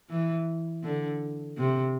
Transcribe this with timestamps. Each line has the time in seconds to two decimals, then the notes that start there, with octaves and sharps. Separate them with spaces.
0.10 E3
0.83 D3
1.58 C3